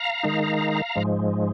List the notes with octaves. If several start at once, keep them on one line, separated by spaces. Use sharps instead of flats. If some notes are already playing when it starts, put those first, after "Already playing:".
Already playing: F5 A#5
D#3 G#3 D#4
G#2 F3 G#3